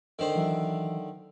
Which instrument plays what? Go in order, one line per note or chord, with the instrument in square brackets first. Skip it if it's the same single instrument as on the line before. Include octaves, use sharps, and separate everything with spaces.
[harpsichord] D3 D#3 C5
[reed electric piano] E3 F#3 E5